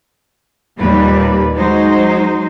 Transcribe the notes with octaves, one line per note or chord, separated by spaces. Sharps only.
D#2 A#2 G3 A#3 B4
F#3 G#3 D#4 C5